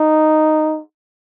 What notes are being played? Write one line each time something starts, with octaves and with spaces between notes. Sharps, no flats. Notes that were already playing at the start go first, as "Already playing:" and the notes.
Already playing: D#4